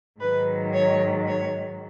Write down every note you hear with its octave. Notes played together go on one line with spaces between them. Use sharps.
G#2 D#3 F#3 B4
C#5
C#5